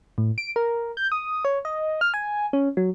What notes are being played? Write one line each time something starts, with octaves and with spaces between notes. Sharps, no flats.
A2
D7
A#4
G6
D#6
C#5
D#5
F6
G#5
C#4
F#3